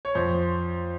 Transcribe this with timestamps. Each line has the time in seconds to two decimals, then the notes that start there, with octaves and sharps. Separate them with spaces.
0.05 C#5
0.15 F2 C5